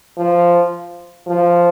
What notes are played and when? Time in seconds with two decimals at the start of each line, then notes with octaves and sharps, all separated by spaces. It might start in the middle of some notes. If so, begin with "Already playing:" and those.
0.18 F3
1.27 F3